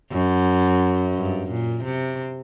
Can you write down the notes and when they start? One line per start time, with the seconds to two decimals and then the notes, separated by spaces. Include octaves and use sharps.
0.12 F#2
1.15 G2
1.50 A#2
1.84 C3